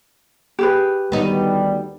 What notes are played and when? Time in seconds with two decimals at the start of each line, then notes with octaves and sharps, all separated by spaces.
0.59 G4 G#4 B4
1.12 D2 D#3 G3 B3 D#4